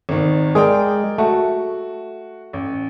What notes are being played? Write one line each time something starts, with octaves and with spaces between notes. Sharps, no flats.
G#1 D#3
G#3 G#4 A#4 D5 G5
A3 F#4
A1